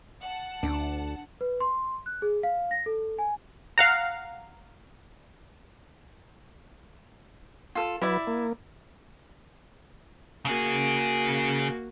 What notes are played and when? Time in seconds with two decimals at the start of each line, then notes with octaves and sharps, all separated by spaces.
0.21 F#5 A5
0.63 D2 D4
1.41 B4
1.60 C6
2.06 F#6
2.22 G#4
2.43 F5
2.71 A#6
2.86 A4
3.19 G#5
3.78 F5 F#5 A#5
7.75 F4 A4
8.02 F#3 E4 B4 D5 E5
8.27 A#3
10.45 C#3 A#3 F#4 G#4